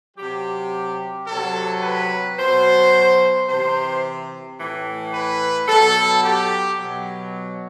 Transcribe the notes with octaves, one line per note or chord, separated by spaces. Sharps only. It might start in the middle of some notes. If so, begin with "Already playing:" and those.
C3 F#3 G4
C3 F#3 A4
B4
B2 F#3 C5
C3 E3 C5
A2 E3
B4
B2 F#3 A4
G4
B2 F#3